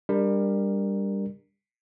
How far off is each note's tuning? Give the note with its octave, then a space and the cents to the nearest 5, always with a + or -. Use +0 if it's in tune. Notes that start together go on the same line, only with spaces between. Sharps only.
G3 +20 D4 +0 A#4 +0